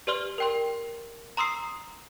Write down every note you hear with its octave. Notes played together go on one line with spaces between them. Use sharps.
G4 B4 D5 C6 F6 G7
A#4 G5 C6
A#5 C6 D#6 E6 C7